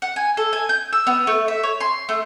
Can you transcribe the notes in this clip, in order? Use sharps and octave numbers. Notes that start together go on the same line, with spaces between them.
F#5
G#5
A4
G#5
G6
E6
B3
A3
E5
C#5
C6
A3